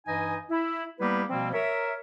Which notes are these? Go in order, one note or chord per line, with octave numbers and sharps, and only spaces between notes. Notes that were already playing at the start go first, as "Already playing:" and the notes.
G2 E3 D#4 D#5 G#5
E4
G3 A#3 B3 E4 G4 B4
B2 F3 G3 A#3 C4
A#4 C#5 E5